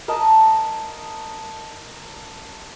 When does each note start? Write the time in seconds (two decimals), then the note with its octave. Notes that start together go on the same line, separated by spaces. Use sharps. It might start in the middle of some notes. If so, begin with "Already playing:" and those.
0.08 A#4 D#5 A5